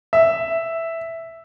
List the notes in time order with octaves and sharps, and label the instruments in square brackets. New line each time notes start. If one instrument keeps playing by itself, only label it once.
[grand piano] E5